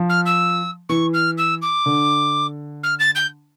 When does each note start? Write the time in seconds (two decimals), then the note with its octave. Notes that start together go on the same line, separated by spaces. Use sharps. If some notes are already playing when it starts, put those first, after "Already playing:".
Already playing: F3
0.09 F6
0.26 E6
0.89 E3 C#6
1.14 F6
1.38 E6
1.62 D6
1.86 D3
2.83 F6
2.99 A6
3.15 G6